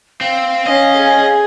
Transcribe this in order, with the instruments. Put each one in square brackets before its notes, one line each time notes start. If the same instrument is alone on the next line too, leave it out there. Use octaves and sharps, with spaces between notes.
[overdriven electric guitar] C4 [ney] F5
[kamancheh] C#4 [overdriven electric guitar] D#5
[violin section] G#4